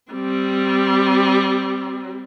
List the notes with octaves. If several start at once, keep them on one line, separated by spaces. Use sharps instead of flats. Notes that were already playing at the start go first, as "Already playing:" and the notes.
G3 C4